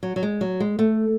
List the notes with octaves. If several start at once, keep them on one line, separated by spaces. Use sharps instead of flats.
F#3
F#3
G#3
F#3
G#3
A3